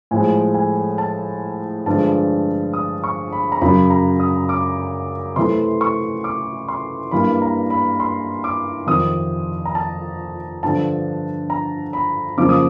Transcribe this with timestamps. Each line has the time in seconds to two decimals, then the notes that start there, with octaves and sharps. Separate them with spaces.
0.11 A2 F3 G#3 G#5
0.54 G#5
0.98 A5
1.86 G2 D3 F3 G#3 A5
2.74 D#6
3.04 C#6
3.32 B5
3.52 A#5
3.61 F#2 C#3 F#3 B5
3.90 A#5
4.20 D#6
4.49 D6
5.36 C3 E3 A3 C6
5.81 C#6
6.24 D6
6.68 C6
7.11 G2 E3 G3 A#3 B5
7.42 A#5
7.70 B5
8.00 C6
8.44 D6
8.87 F2 C3 D#3 D#6
9.65 A#5
9.75 A5
10.63 G2 D3 F3 A5
11.50 A#5
11.93 B5
12.37 F2 C#3 F3 A#3 D6
12.49 D#6